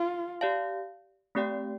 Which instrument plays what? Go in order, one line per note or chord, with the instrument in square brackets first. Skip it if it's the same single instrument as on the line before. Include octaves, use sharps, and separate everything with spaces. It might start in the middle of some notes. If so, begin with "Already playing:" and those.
Already playing: [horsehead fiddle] F4
[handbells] G4 D5 F5 A5
A3 C4 G4 D5 G5